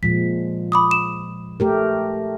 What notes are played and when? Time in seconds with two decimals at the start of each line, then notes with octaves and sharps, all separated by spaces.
0.03 A#2 F3 G#3 B6
0.72 B5 D6 D#6
0.91 E7
1.60 A3 G4 A#4